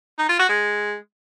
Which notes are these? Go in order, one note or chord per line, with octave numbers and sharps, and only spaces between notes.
D#4
F4
F#4
G#3